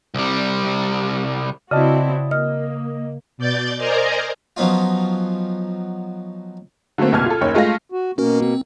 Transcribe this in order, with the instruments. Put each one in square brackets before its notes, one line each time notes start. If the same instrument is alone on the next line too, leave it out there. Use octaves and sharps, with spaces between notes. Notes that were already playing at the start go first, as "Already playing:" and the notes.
[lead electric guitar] C2 G3
[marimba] C#3 [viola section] C4 E4 F#4 [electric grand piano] D5 D#5 A5
[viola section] A#3 [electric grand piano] D#5 [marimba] F6
[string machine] B2 D5 G6 A6
A#4 C5 D5 D#5 G#5 A#5
[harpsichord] F3 F#3 B3 C#4 D#4 F4
[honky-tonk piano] D3 F#3 A3 A#3 C4
F#1 C2 B2 A5 F6 G#6
F4 A4
F#1 D#2 C#5
G#3 A3 F4 G#4 F5 A#6
[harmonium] F#4
[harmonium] B2 A#3 [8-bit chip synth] C#4 F#4 A#4
[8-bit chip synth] C4